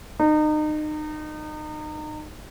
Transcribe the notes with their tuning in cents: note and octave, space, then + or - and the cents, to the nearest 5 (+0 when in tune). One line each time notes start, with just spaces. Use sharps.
D#4 -30